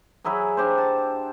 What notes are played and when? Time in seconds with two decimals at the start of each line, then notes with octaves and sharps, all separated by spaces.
0.24 F#3 E4 G#4 A#5
0.57 D4 G4 C5
0.78 A5